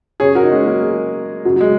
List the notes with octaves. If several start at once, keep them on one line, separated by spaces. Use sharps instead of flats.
F#2 C#3 G#4 C#5
F#4 A#4
D#4
G#3 C#4
F#3 A#3
G#3
F#2 C#3 F#3
F#3
G#3